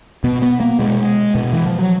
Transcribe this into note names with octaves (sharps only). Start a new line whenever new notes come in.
B2 B3
B3
A#3
B2 G#3
B2
E3
F3
F#3